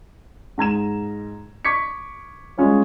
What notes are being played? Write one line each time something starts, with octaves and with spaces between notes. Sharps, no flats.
G#2 A#5 G#6 E7
C#6 D6 G#6 B6 C#7
G3 G#3 C#4 F4 C#5